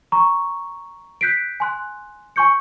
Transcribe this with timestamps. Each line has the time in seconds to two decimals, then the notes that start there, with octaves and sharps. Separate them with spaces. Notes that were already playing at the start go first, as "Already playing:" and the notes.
0.12 A#5 C#6
1.21 F#6 G6 B6 C7 D7
1.60 G#5 C6 F#6
2.36 G#5 C6 C#6 G6 C#7